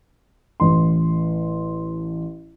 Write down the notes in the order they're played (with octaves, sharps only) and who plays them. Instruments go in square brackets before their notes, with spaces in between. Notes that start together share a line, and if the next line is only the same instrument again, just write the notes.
[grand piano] A1 C6